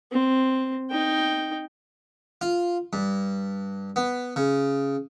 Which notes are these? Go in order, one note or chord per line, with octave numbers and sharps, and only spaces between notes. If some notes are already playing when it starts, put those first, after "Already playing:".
C4
D#4 G5
F4
G2
B3
C#3